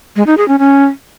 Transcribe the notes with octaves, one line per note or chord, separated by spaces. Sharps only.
G#3
D#4
G#4
C#4
C#4